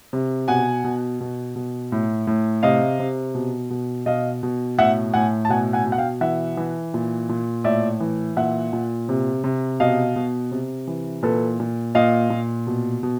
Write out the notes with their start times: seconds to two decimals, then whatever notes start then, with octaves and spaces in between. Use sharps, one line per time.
0.13 C3
0.48 B2 F#5 G#5
0.84 B2
1.21 B2
1.56 B2
1.92 A2
2.27 A2
2.63 C3 D#5 F5
2.99 C3
3.35 B2
3.70 B2
4.06 B2 D#5 F5
4.43 B2
4.78 A2 E5 F#5
5.14 A2 F#5 G#5
5.45 A5
5.49 B2 F#5 G#5
5.73 F#5 G#5
5.85 B2
5.92 F#5
5.98 F5 G5
6.21 E3 E5 F#5
6.57 E3
6.94 A#2
7.29 A#2
7.64 A2 D5 E5
8.00 E3
8.37 A#2 E5 F#5
8.73 A#2
9.09 C3
9.44 C3
9.80 B2 D#5 F5
10.16 B2
10.51 C3
10.87 E3
11.23 A#2 A4 B4
11.60 A#2
11.95 A#2 D#5 F5
12.30 A#2
12.67 B2
13.03 B2